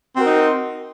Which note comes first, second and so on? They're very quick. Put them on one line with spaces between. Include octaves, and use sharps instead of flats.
C4 F#4 A#4 D#4